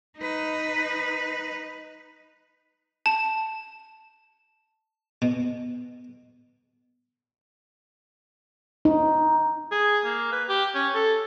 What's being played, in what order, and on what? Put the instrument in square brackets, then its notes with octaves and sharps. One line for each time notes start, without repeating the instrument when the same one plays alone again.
[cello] D#4 B4
[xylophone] A5
[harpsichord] B2
[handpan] D#4
[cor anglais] G#4
A#3
B4
G4
C#4
A4